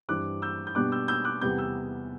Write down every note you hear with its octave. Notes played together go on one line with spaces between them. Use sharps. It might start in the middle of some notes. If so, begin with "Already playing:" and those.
G2 E3 G3 C4 D6 F#6
E6 G6
G6
B2 G3 B3 D4 D6 F#6
E6 G6
E6 G6
D6 F#6
E2 C3 G3 B3 G6
E6 G6